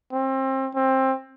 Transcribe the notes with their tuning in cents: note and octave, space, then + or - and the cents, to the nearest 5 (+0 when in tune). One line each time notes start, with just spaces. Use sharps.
C4 +30
C4 +20